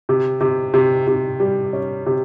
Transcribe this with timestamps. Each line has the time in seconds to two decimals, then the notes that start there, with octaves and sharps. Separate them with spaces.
0.09 C3
0.41 C3
0.74 C3
1.07 C3
1.40 G3
1.73 C#4
2.06 C3